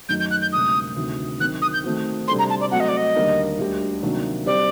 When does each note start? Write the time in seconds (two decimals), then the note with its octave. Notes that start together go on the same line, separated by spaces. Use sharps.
0.09 F#2 D#3 F#3 A3 D#4 G6
0.20 G6
0.31 F#6
0.42 G6
0.53 D2 C3 G3 A#3 D#6
0.97 D2 C3 D#3
1.40 D#3 F#3 C4 F#6
1.62 D#6
1.73 G6
1.84 D#3 A3 C4 F#4
2.28 C3 G3 D4 A4 C5 C6
2.39 A#5
2.50 A5
2.61 D5
2.72 F#3 A3 C4 F#4 F#5
2.80 D#5
2.89 D5
2.97 D#5
3.15 D#2 D3 G3 A#3 D#4
3.59 D2 D3 G3 D4 G4
4.02 C3 D#3 F#3 A#3 D4
4.46 G3 C4 G4 C5 D5